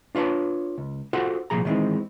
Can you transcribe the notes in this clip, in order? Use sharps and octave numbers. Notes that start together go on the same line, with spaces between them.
D4 F4 B4 C#5 A5
C#2
F4 F#4 A4 C5 F5 F#5
C2 F2 A#2 F3 G#4 A#5
D#3 E3 G#3 A#3 C4 D#4